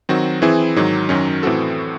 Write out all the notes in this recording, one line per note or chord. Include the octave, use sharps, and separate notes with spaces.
D#3 F#3 C4 F#4
E3 C4 E4 G#4
G#2 D#3 F#3
F#2 D#3 F#3 C#4
A2 E3 C4 F#4 A4